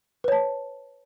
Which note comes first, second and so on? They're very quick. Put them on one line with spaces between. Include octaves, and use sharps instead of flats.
B4 C#5 A5